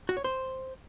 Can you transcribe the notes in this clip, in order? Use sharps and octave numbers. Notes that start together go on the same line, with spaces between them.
F#4
C#5
C5